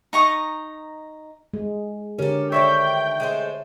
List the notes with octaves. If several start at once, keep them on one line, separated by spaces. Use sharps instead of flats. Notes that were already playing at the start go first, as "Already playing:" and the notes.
D#4 A#5 C#6 D#6
G#3
D3 C#4 G4 A4 A#4
D#3 D4 C5 C#5 E5 G5
G#3 A3 C5